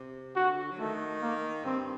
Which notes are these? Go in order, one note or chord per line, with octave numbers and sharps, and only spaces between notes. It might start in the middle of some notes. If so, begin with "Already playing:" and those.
Already playing: C3
D3 F#4
F#3
D#3 A3
A#3
G2 C4